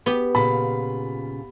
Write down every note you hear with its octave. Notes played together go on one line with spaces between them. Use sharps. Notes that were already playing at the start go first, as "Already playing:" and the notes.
B3 G4
A#2 C#3 F4 B5